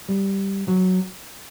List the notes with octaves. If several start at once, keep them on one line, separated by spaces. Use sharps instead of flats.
G3
F#3